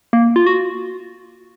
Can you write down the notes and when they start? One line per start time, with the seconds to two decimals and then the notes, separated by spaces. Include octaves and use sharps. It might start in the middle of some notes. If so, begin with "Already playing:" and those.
0.13 A#3
0.36 F4
0.47 F#4